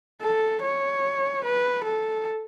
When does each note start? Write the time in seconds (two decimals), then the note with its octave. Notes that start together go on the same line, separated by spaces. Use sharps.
0.22 A4
0.62 C#5
1.44 B4
1.84 A4